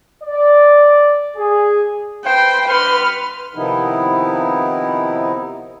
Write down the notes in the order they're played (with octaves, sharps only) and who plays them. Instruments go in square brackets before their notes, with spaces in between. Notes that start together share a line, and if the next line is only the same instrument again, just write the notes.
[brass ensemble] D5
G#4
[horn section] B4 C5 [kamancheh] G5
[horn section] G2 F#5 C6 [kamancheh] B4 F6
[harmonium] C3 D#3 F3 B3 D#4 E4